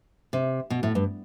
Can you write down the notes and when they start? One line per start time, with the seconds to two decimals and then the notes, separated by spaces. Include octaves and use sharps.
0.33 C3
0.70 B2
0.83 A2
0.95 G2